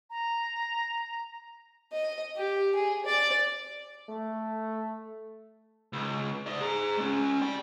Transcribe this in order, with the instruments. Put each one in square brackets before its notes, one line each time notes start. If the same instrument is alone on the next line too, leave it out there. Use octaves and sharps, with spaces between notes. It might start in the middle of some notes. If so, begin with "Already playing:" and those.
[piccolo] A#5
[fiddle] D#5
G4
G#4
D5
[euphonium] A3
[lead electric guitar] C#2
D5 E5
G#4 A#5
G#3 C#4
D5 G5